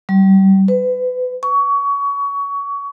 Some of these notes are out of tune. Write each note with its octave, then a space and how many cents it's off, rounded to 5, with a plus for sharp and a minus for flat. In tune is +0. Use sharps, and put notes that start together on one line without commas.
G3 -30
B4 +30
C#6 +25